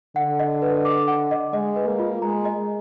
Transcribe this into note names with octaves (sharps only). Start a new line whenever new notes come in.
D3 F#5
D#5
B4
D6
F#5
D#5
G#3 D#5
B4
A#3
F4
G#3 A#5
D#5